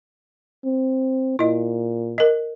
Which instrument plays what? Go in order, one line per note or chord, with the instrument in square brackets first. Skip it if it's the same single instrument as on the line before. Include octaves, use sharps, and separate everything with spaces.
[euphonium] C4
[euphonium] A#2 [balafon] E4 D#5
[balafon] A#4 D#5